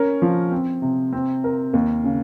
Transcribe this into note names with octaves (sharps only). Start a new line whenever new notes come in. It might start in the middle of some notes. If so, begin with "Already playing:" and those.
Already playing: C#4 A#4
F3
C4
C3
C4
A#4
D#2
C#3